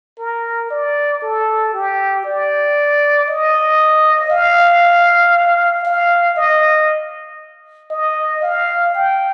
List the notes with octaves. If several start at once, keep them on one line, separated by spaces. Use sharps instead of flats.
A#4
D5
A4
G4
D5
D#5
F5
F5
D#5
D#5
F5
G5